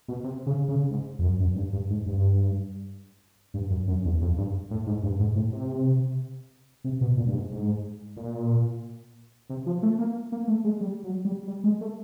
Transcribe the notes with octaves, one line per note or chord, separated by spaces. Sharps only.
B2
C3
C#3
C#3
G#2
F2
F#2
F#2
G2
G2
G#2
G2
G2
F#2
F#2
E2
F2
G2
A2
G#2
G2
G#2
A2
C3
C3
B2
A#2
G2
G#2
G#2
A#2
C3
F3
A3
A#3
A#3
A3
G#3
G3
F#3
G3
G3
G#3
A3